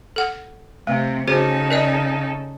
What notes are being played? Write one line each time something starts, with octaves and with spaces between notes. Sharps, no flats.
A4 F#5
C3 A3
C#3 D#4 F#4 G#4 A4 C5
A#4 D5 D#5